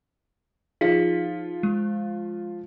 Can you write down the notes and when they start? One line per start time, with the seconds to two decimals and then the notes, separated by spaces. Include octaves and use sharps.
0.81 F3 D#4 F4 G#4 B6
1.63 G#3